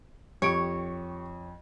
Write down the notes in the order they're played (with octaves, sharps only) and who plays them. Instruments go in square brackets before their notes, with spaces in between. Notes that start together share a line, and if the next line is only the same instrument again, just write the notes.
[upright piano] F2 D7 [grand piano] G4 C#6 [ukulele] C#5